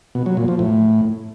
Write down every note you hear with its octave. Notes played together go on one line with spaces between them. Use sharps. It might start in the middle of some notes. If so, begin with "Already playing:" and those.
B2
F#3
A#2
F3
A2